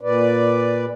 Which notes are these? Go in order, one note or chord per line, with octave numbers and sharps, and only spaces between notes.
A#2 B4 D5